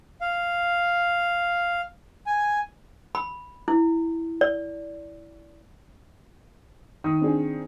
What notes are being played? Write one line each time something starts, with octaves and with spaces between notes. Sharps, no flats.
F5
G#5
B5
E4
D5
D#3 D#6
C4 D4 G#4